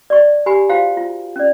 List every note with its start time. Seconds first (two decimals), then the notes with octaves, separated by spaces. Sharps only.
0.10 D5 C#6
0.46 G4 G#5 B5
0.69 F4 F#4 C5 F5 G5 A#5
0.97 F4
1.36 C#4 D5